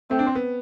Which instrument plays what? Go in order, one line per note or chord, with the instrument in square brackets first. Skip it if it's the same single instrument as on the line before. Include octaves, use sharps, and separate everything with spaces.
[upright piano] A3 [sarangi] C4
[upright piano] D4
C4
B3